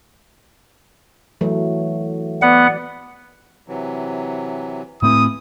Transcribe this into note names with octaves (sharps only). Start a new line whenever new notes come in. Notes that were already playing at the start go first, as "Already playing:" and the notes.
E3 F#3 A3
B3 D5 F#5
C3 E3 F#3
A2 E3 A3 C4 E4 D#6